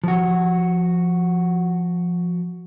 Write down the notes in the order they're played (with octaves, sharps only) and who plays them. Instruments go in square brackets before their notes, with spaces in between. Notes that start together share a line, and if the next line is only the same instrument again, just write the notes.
[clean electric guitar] F3 F#4